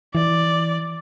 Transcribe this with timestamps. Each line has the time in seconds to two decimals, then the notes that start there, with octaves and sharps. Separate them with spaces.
0.15 E3 D5